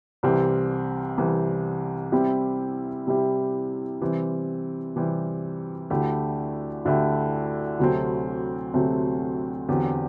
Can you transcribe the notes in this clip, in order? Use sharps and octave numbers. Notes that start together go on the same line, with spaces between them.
C2 C3 E3 G3 C4
C2 C3 E3 G3 C4
C3 G3 C4 E4 G4
C3 G3 C4 E4 G4
C3 E3 G3 C4
C3 E3 G3 C4
D2 D3 A3 E4 G4
D2 D3 A3 E4 G4
D2 C3 F#3 A3 C4
D2 C3 F#3 A3 C4
E2 D3 F#3 C4 G4